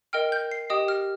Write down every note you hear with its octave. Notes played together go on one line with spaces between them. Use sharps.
A#4 D#5 G5 F6
G6
C7
G4 D#5 G5 D#6
F6